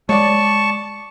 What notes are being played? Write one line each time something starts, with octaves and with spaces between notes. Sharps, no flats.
G#3 C#5 D5 A5 C#6